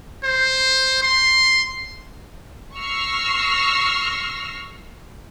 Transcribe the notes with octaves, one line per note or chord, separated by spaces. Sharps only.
C5
C6
C#6 E6 F6 A#6 C7